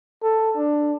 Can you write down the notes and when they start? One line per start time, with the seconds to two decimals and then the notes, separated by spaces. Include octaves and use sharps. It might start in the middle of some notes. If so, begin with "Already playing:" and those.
0.23 A4
0.56 D4